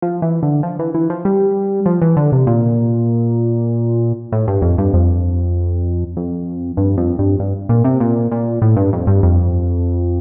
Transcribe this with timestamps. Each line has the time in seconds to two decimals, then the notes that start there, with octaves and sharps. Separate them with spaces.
0.02 F3
0.22 E3
0.43 D3
0.63 F3
0.79 E3
0.94 E3
1.10 F3
1.25 G3
1.86 F3
2.02 E3
2.17 D3
2.32 C3
2.47 A#2
4.32 A2
4.48 G2
4.62 F2
4.78 G2
4.94 F2
6.17 F2
6.77 G2
6.97 F2
7.19 G2
7.39 G2
7.69 A#2
7.84 C3
8.00 A#2
8.32 A#2
8.62 A2
8.76 G2
8.93 F2
9.07 G2
9.23 F2